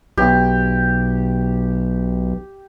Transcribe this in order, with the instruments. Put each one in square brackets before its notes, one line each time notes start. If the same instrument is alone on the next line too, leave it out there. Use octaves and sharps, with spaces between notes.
[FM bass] B1 [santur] G4